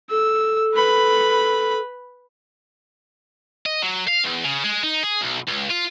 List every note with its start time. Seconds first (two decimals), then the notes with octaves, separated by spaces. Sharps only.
0.10 A4 E6
0.75 B4 B5
3.66 D#5
3.82 F#3
4.07 F5
4.23 E2
4.44 C#3
4.64 G#3
4.83 D#4
5.03 G#4
5.21 B1
5.48 C#2
5.70 F4